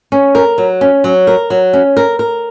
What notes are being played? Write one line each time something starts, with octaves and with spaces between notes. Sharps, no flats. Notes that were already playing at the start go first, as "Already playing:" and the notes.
C#4
A#4
F#3
C#4
F#3
A#4
F#3
C#4
A#4
A#4